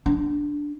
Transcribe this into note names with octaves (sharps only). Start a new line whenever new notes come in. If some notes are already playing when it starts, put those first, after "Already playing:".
D4